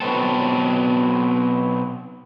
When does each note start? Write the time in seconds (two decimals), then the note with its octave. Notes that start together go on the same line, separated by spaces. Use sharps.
0.01 B2 F#3 B3 C4 A4